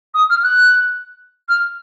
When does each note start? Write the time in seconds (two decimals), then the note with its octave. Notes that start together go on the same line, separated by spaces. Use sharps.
0.14 D#6
0.30 F6
0.44 F#6
1.49 F6